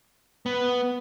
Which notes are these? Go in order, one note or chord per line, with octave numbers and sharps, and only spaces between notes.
B3